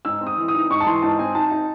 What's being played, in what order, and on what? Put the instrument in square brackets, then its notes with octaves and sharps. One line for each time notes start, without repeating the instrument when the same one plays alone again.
[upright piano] G#2 E6
C4
D#6
E3
D#6
D#4
G#2 C#6
A5
E3 C6
G#2 A5
C4 G#5
D#4 A5
D#4